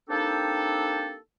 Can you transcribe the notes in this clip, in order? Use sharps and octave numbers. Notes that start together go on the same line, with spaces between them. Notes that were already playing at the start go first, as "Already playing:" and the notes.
A#3 C4 D4 D#4 G4 A4